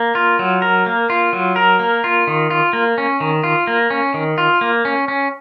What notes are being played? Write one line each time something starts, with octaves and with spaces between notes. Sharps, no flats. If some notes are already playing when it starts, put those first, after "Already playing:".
Already playing: A#3
F4
F#3
A#4
A#3
F4
F#3
A#4
A#3
F4
D#3
F4
A#3
C#4
D#3
F4
A#3
C#4
D#3
F4
A#3
C#4
C#4